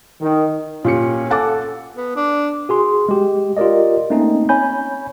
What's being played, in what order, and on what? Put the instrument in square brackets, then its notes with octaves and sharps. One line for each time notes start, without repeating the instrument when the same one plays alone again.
[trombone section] D#3
[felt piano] A#2 G4 [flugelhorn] C#4 [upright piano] F4 C#7
[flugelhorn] A4 [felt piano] F5 F#5 A6 [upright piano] G#5 D6
[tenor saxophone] B3
D4
[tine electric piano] F#4 G#4 C6
G#3 G4
F4 G4 A#4 D5 D#5
A3 A#3 C4 C#4 D#4
C#5 G#5 B5 G6